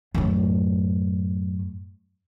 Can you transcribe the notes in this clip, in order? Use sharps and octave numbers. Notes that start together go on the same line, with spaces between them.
F#2 A2